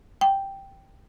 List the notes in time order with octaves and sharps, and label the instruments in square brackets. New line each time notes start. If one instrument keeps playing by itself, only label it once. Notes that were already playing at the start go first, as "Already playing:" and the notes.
[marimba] G5